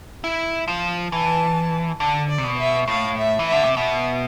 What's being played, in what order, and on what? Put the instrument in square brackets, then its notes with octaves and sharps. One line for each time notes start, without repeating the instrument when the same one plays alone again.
[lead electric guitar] E4
F3
[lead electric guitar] E3 [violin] A5
[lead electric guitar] D3 [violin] A5
[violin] D5
[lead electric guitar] C3
B2
[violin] E5
[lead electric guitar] A2 [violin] F5
[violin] E5
[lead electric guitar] E3
[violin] E5
[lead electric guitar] D3
C3
[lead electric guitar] B2 [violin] E5